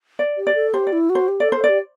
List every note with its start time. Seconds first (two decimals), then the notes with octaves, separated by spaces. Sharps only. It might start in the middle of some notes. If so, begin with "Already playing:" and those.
0.19 D5
0.37 G4
0.47 D5
0.55 A4
0.74 G4 C5
0.87 D5
0.93 E4
1.10 F#4
1.15 C5
1.28 G4
1.40 A4 D5
1.52 A4 C5
1.64 D5
1.69 G4